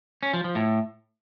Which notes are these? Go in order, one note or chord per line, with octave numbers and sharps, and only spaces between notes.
C#4
F3
F3
A2